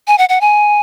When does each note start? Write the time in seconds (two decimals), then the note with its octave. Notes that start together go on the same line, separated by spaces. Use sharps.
0.07 G#5
0.18 F#5
0.29 F#5
0.41 G#5